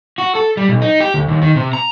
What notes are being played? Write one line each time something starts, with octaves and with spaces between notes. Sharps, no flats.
F#4
A4
G3
B1
D#4
G4
D2
D#2
D#3
C3
A#5